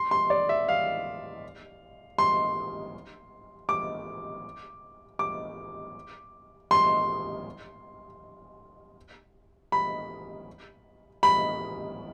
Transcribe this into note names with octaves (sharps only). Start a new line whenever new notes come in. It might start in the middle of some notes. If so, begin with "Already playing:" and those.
Already playing: C6
C6
D5
E5
F5
C6
D6
D6
C6
B5
B5